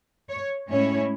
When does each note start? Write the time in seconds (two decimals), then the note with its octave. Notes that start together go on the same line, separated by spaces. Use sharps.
0.29 C#5
0.70 A2 G#3 C#4 E4 C#5